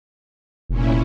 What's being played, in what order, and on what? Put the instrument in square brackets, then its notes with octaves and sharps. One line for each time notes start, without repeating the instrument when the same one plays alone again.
[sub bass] F1 [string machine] A#2 C#4 E4